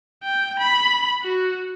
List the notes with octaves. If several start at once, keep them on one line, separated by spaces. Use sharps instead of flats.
G5
B5
F#4